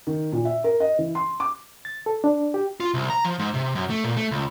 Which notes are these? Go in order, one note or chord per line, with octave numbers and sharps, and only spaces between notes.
D#3
A#2
E5
A#4
D#5
E3
C6
D6
A6
A4
D4
G4
F4
C2
A#5
F3
G#2
C3
F#2
A3
A#2
A3
C#2